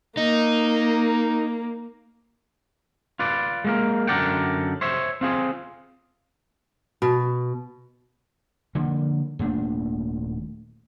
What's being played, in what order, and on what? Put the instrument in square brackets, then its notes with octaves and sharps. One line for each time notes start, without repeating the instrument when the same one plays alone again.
[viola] A#3 [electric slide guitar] D#4
[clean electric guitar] F4 B4 D5
G#3 A#3 A#4
F#2 D3 A#4 D5 F#5 G5
C5 C#5 E5
C4 F4 G#4
[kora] B2
[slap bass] D3 F3 A#3
D#1 A#2 A3 D4